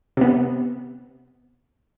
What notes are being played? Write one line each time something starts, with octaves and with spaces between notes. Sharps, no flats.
C3 B3